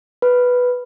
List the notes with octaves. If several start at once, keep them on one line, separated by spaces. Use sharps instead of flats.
B4